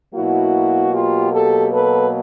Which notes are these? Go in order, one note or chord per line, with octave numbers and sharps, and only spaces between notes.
B2 F#3 A#3 E4 F#4
F4 G4
G4 A4
A4 B4